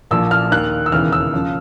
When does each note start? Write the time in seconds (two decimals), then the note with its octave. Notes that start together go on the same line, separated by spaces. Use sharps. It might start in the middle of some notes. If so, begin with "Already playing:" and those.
0.11 A#1 A#2 F3 E6
0.31 F6
0.52 D#2 D#3 F#6
0.86 E6
0.92 E1 D#2 C#3 E3 F6
1.12 E6
1.33 C#3 F3